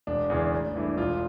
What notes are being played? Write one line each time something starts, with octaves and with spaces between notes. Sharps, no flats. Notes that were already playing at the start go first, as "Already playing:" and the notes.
E1 D4
E2 C#3 E3
A1
G2 E3 A3
E1 F4